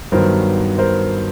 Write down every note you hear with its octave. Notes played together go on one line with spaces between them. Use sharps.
G2 D#3 F#3 B3 A#4 C5
A#4 C5